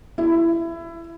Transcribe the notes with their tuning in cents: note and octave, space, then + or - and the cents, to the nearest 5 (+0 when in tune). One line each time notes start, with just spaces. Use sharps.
E4 +20